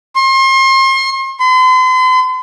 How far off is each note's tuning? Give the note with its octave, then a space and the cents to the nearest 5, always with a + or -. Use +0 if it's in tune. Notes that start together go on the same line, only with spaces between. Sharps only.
C6 +35
C6 -45